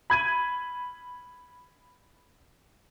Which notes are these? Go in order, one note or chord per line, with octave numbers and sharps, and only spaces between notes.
B5 G#6 D#7